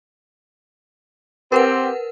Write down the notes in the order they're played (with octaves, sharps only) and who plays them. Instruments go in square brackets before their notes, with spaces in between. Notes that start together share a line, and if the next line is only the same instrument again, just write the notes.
[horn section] C4 G4 [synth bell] A#4 B4 F#5